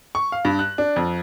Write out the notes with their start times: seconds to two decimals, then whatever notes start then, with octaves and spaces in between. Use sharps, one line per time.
0.15 C#6
0.32 F5
0.45 G2
0.59 F#6
0.78 D4
0.96 F2